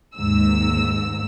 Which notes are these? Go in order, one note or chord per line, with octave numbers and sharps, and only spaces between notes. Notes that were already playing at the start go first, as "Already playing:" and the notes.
D#2 G#2 E6